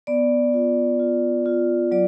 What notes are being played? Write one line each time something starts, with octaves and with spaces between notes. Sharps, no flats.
B3 D5
F4
F4
F4
F#3 D5